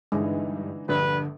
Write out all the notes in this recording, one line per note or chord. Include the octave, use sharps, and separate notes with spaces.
G2 D3 E3 G#3 D#4
A#1 G2 D3 B4